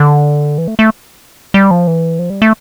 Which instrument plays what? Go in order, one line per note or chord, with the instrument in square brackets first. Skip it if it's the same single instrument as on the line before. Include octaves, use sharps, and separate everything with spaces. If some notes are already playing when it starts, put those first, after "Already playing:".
Already playing: [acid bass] D3
E3
A3
A3
G3
F3
E3
F3
G3
A3